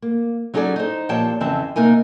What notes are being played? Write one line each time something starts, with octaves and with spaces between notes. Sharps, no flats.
A#3
F#3 C#4 D#4 G#4 A4 D5
D#4 C5
A#2 F3 G4 C#5 G5 A5
F2 C#3 E3 C4 E5 A5
C3 A#3 D#4 A#4 G#5